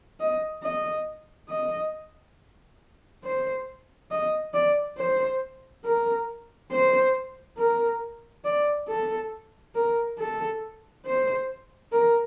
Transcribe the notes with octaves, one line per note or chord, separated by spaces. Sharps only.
D#5
D#5
D#5
C5
D#5
D5
C5
A#4
C5
A#4
D5
A4
A#4
A4
C5
A#4